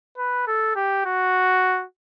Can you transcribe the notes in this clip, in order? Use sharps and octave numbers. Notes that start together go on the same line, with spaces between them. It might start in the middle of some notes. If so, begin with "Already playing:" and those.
B4
A4
G4
F#4